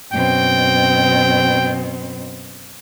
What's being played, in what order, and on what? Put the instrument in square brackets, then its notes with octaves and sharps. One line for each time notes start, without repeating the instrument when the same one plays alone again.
[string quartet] F#2 B2 C4 [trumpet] G5